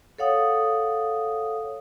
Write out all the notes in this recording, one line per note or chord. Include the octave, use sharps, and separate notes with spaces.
A4 C#5 F5 F#5 D#6